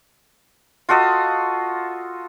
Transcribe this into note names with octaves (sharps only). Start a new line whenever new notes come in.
F4 F#4 A4 D#5